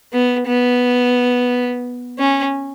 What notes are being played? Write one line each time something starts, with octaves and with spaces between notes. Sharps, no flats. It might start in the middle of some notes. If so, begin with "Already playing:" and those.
B3
B3
C#4